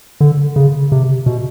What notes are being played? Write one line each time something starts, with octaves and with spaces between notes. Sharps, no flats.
D3
C#3
C3
B2